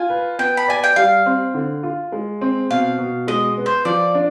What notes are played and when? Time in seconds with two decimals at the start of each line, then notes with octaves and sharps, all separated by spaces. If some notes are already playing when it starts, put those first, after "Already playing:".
Already playing: F4 G#5
0.10 B4
0.39 B3 G5
0.57 B5
0.68 D5 G#5
0.84 G5
0.96 G3 F5
1.26 C4
1.54 D3
1.83 F4
2.12 G#3
2.41 C4
2.70 B2 F5
2.99 B2
3.27 G#3 D#5
3.57 B3
3.66 C5
3.85 F3 D5
4.15 D4